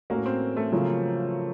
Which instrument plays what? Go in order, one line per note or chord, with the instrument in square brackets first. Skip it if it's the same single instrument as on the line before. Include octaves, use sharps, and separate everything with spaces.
[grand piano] A2 A3 C#4 F#4 A#4 [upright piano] A#3
[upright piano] C4
A3
[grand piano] C#3 F3 A#3 C#4 [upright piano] F#3